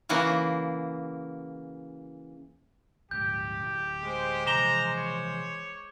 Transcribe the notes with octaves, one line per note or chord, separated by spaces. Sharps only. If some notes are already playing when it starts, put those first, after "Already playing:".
C#3 E3 A#3 F#4
D2 G#2 G4 G6
D1
G#3 C5
C3 E3 F3 A#5 D6 E7 G7
C#5